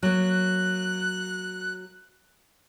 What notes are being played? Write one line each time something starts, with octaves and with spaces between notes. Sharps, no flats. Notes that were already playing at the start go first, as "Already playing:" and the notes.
F#3 A#3 F#6